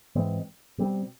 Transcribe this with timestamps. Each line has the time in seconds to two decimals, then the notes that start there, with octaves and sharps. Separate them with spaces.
0.15 G#2 E3 G#3 C4
0.78 B2 G3 C4